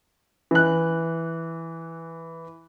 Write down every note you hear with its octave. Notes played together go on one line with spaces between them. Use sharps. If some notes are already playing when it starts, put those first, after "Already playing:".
E3 F#6